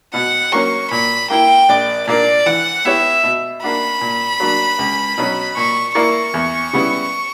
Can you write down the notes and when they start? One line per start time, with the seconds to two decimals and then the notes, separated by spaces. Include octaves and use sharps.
0.14 B2 F#5
0.52 F#3 A#3 C#4 C#6
0.91 A#2 B5
1.30 A#3 E4 G5
1.69 A#1 D5
2.07 A#2 A#3 D4 A#4 D5
2.46 E3 F#5
2.85 B3 E4 G4 C#5 E5
3.23 B2
3.63 A#3 D4 F#4 B5
4.01 A#2
4.40 F#3 A#3 D4
4.79 C#2
5.18 B2 F#3 C#4
5.56 A#2 C#6
5.95 A#3 E4 A#4 D5 C#6
6.34 E2
6.73 C#3 G3 B3 E4